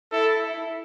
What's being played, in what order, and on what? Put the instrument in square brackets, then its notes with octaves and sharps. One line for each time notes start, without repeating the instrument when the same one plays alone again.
[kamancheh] E4 [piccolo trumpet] A4